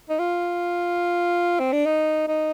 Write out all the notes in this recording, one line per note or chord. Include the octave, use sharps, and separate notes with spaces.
D#4
F4
C4
D4
D#4
D#4